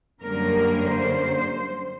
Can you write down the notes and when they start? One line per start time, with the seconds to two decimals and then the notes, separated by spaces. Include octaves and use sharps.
0.22 F#2 D3 G3 A#3 C#4 A#4
0.89 C5